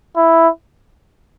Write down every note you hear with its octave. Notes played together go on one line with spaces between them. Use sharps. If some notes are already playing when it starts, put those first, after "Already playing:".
E4